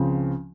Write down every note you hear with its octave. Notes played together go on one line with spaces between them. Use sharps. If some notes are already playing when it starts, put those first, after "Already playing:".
Already playing: C#2 C#3 F3 C4